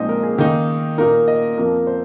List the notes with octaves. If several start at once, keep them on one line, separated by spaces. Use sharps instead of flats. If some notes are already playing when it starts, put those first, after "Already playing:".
Already playing: A#2 F3 G#3 C4 D#4 C5 D#5
A#4
G#4
D#3 A#3 D#4
A#2 A#3 D#4 A#4
D#5
F2 F3 A#3 A#4
C5